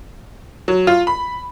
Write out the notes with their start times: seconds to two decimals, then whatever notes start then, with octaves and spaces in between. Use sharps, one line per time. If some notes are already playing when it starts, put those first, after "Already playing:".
0.68 F#3
0.87 F4
1.07 B5